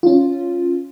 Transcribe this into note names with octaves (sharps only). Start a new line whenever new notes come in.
C#4 F4